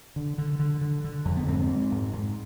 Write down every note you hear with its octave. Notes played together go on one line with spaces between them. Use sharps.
D3
D3
D3
D3
D3
F2
B3
G#2 C4
G#2
G#2
G#2